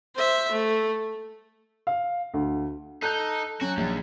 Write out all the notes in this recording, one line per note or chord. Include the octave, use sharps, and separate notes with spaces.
C5 E5
A3
F5
D2
D#4 A4 F#6 G6
F#3 C#4 F#4
A#1 D#2